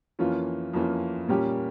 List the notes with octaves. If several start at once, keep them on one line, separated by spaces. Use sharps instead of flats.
F2 E3 A#3 C#4 F4
F2 E3 A#3 C#4 F4
A#2 G3 C#4 G4 A#4